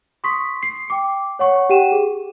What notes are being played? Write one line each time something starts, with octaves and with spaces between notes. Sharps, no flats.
C6 C#6 D#6 B6
C7
G5 D6 C#7
C#5 F#5 C#6
G4 F#5 G5 D#7 E7
G#4